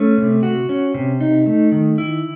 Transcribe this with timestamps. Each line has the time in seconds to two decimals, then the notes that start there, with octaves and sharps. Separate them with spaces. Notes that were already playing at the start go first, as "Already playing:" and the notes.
Already playing: A3 C#4
0.18 C3
0.43 F#4
0.69 C#4
0.94 C3
1.21 D#4
1.46 A3
1.72 D#3
1.98 E4